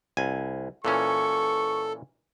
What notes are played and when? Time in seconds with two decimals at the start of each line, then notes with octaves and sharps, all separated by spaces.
0.17 C2 G#5
0.85 A#2 E3 C#4 A4 C#6